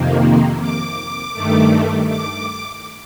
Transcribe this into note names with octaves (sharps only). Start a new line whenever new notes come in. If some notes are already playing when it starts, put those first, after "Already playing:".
Already playing: F2 C3 D#3 A#3
D6
G2 D#3 A3
D6